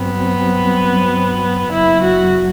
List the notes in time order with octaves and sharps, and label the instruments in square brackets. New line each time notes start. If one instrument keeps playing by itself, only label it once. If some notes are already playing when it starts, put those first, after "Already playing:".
Already playing: [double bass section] G2 F#3 C4 [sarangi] B3
[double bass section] F#1 F#2 F#3 [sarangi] E4
[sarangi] F#4